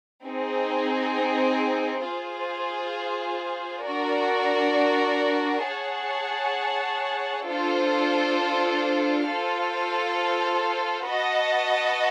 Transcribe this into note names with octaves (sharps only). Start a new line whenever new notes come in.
C4 D#4 G#4
F4 G#4 C5
D4 F#4 A#4 D5
G#4 C#5 F#5 A5
D4 F4 A4 C5
F4 A4 C5 F5
F#4 B4 D#5 F#5 A5